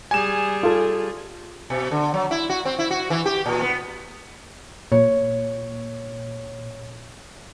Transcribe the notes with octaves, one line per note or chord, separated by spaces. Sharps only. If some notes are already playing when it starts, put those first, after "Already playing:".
G3 G#4 G#5 E7
F4 A4
B2
D3
F#3
E4
F#4
C4
E4
F#4
E3
G4
A#2
B3
A#2 C#5